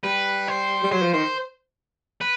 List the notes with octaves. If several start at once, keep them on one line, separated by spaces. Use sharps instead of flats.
G3 B4
C5
G3
F#3 C5
F3
D#3 C5
B4